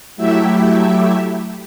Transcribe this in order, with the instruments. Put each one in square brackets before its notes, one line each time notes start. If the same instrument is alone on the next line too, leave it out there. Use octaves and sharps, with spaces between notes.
[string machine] F#3 A3 E4 G4 E5